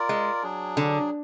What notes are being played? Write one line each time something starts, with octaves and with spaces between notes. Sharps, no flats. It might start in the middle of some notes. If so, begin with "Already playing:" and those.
Already playing: F4 A#4 D5
G#3
F#3 D4 G#4
D3